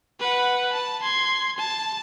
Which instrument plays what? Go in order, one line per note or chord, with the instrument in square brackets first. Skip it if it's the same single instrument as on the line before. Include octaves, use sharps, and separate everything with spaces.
[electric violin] B4 F#5
A5
C6 G#6
A5